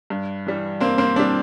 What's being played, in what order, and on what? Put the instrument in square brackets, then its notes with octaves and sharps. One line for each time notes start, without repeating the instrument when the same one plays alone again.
[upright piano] G2
E3 G3
G2 A#3 C4
A#3 C4
E3 C4 D4
G3